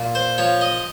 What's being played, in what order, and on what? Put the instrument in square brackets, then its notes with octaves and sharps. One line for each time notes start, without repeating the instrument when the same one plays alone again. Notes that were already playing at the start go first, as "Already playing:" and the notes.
Already playing: [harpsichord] A#2
C5
F3 C#5
D#5